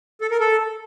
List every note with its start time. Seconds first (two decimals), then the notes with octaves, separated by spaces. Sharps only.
0.21 A4
0.31 A#4
0.40 A4